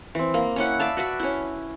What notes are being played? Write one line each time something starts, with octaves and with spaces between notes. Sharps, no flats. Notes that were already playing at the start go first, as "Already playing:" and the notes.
E3 C4
A#3
C#4 E4 F#5
D5 E5 F5 A5
F#4 B4 D5 E5
C#4 E4